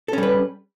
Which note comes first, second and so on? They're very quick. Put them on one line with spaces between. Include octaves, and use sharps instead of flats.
A4 C#4 G3 B4